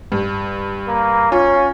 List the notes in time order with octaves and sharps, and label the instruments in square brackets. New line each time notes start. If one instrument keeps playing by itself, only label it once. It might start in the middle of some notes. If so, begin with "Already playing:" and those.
[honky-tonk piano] G2
[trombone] A#3
[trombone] C#4 [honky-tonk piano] F4